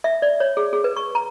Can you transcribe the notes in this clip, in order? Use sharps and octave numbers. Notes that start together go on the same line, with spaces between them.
E5
D5
C#5
G#4
G#4
B4
C#6
A#5